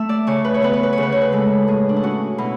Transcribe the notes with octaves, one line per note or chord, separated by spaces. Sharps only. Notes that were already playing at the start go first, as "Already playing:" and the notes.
Already playing: A3 E5
D5
C#3 C#5
B4
C#5
B3 B4
C#5
B4
C#3 C#5
B4
C#5
B4
G#3 A4
A2 G#4
D4
E4
C#4 F#4
B2 E4